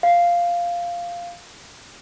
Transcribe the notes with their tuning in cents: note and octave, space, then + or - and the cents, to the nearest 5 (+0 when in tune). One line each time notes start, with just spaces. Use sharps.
F5 -5